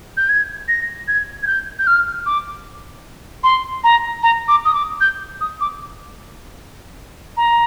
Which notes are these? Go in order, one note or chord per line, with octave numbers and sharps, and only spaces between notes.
G6
G#6
A#6
G#6
G#6
G6
G6
F6
D6
C6
A#5
A#5
D6
D#6
D6
G6
D#6
D6
A#5